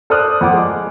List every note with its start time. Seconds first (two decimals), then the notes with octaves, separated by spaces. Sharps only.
0.10 A4 C5 D5 D#6 F6 F#6
0.41 F2 F#5 D6
0.53 G#3